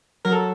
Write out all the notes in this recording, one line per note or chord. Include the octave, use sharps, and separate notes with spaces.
F#3 A#4
A4